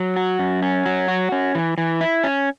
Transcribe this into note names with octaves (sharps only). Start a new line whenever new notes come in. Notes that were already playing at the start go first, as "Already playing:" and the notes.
Already playing: F#3
F#4
F#2
C#4
F#3
F#4
C#4
E3
E3
E4
C#4